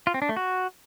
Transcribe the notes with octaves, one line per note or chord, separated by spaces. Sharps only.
F4
C4
D4
A3
F#4